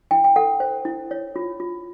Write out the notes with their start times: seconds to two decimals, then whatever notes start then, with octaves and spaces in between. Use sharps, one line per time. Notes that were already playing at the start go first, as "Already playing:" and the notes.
0.11 E4 G5
0.24 G5
0.36 A4 F#5
0.60 C5
0.85 E4
1.11 C#5
1.36 F4
1.60 F4